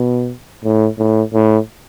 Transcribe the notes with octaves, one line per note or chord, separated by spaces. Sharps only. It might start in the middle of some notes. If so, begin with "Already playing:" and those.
Already playing: B2
A2
A2
A2